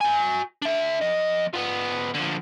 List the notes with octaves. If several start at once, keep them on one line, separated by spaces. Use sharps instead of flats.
F#4 G#5
D4 E5
F2 D#5
F3 B3
D3 F3